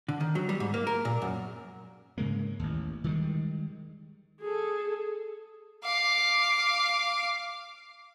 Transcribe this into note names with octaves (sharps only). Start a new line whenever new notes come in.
D3
D#3
F#3
G3
G#2
A#3
A#4
A#2
F#2
G#2 C#3 G#3 A#3
A1 D#2
D#3 G3 G#3
G#4 A4
F5 D6